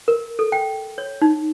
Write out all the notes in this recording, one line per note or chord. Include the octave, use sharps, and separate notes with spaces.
A#4
A4
G5
C#5
D#4